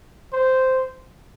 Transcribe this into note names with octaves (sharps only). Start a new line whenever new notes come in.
C5